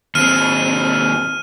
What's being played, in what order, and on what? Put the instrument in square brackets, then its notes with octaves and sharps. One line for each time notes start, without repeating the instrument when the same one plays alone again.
[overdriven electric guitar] D#2 C4 [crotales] F6 D#7